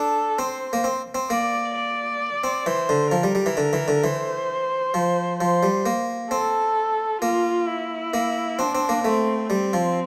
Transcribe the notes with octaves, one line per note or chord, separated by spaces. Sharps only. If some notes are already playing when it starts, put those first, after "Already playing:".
Already playing: D4 A4
C4 C5
A#3
C4
C4
A#3 D5
D5
C4
E3 C5
D3
F3 A#4
G3
G3
E3
D3
E3
D3
E3 C5
F3
F3 C5
G3
A#3
C4 A4
A#3 F4
E4
A#3
C4 D4
C4
A#3
A3 C4
G3 C4
F3